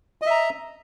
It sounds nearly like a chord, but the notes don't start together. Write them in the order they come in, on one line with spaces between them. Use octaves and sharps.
D#5 E5 A#5